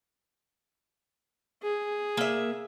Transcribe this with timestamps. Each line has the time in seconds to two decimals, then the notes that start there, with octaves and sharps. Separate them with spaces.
1.63 G#4
2.17 A#3 E5